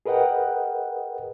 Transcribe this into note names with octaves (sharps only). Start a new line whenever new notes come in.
G#4 A#4 B4 D#5 F#5 G5